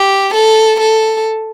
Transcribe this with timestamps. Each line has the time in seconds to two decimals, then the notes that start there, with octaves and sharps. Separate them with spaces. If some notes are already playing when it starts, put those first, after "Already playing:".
Already playing: G4
0.34 A4
0.80 A4